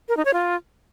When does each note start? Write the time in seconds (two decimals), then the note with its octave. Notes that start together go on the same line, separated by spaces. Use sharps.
0.09 A#4
0.17 D#4
0.25 C#5
0.34 F4